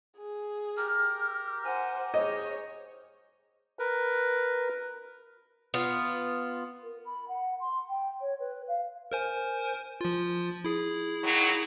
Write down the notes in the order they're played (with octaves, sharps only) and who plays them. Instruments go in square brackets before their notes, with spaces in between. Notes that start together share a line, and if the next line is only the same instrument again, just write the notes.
[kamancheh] G#4
[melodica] G4 A#4 [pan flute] F6
[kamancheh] C5 F#5 [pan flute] G#5
[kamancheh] G#4 C#5 [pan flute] C5 [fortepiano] D#5
[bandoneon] A#4 B4
[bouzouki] B3 F4
[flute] A#4
B5
F#5
C6
G5
C#5
B4
F5
[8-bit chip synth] A#4 C5 G#5
F3 F4
E4 G#4
[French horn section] A#2 D#3 F#3